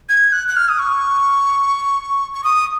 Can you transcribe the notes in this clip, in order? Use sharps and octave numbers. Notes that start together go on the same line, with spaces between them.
G#6
F#6
F#6
F6
D#6
C#6
C#6
D#6